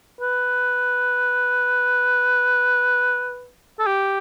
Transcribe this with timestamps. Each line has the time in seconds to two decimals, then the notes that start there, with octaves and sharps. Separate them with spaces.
0.21 B4
3.79 A4
3.86 G4